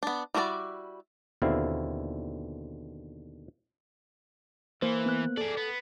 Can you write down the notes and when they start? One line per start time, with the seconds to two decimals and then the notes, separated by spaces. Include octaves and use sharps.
0.03 B3 D4
0.34 G3 E4 F#4 A#4 D5
1.42 D#2 B2 D3 C4 E4 F5
4.82 E3 A#3 C5
5.06 B3 F#6
5.37 G#4 A4 D5
5.57 B3